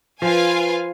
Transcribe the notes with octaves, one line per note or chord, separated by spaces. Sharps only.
F3 F4 B4 F5 G#5